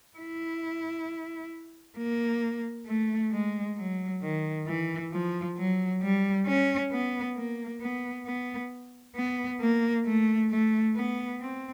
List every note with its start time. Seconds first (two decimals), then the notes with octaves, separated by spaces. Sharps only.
0.18 E4
1.98 A#3
2.87 A3
3.32 G#3
3.77 F#3
4.22 D#3
4.67 E3
5.12 F3
5.57 F#3
6.02 G3
6.47 C#4
6.92 B3
7.36 A#3
7.81 B3
8.26 B3
9.16 B3
9.61 A#3
10.06 A3
10.50 A3
10.96 B3
11.41 C4